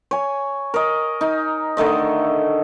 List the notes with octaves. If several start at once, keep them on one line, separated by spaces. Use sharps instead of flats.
C#5 G#5
A#4 D#5
D#4
D3 D#3 A3 D#5